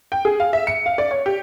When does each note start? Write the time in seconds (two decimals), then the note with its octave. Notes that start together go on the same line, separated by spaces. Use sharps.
0.12 G5
0.25 G#4
0.40 F5
0.53 E5
0.67 C#7
0.86 F5
0.98 D5
1.11 C#5
1.26 G4